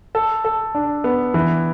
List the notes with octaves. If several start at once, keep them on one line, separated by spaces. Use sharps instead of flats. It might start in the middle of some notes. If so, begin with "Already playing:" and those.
A4
A4
D4
B3
E3